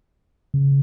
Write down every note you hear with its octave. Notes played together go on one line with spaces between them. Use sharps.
C#3